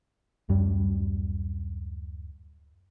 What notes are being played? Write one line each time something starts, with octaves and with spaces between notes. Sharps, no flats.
D1 F#2 G3